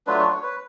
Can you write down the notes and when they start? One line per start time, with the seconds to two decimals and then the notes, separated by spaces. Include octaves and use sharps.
0.07 F#3 A3 D4 F4 B4
0.20 C#5
0.31 C#5
0.43 B4